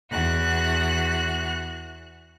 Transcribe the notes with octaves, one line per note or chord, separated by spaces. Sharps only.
E2 F#4 F#6